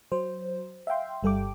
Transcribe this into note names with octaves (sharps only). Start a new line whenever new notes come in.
F#3 C5
E5 F5 G5 C6
G1 G3 A4 G5 D6